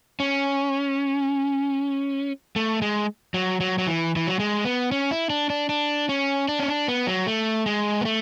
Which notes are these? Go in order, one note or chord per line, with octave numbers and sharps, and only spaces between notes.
C#4
A3
G#3
F#3
F#3
F#3
E3
E3
F#3
G#3
B3
C#4
E4
D4
D4
D4
C#4
D4
C#4
D4
B3
F#3
A3
G#3
B3
A3